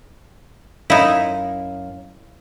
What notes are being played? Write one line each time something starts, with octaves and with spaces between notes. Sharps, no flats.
F#2 D#4 E4 F5